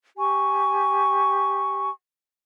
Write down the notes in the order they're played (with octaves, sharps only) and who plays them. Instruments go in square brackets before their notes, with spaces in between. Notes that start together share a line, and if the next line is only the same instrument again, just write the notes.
[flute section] G4 G#5 C#6